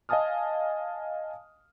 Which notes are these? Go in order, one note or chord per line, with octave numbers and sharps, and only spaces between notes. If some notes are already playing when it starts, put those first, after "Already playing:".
D#5 F5 G#5 A5 D#6 F6